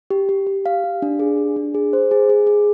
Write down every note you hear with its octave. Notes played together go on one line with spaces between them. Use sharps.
G4
G4
G4
F5
G4
D4
G#4
D4
D4
G#4
C5
G#4
G#4
G#4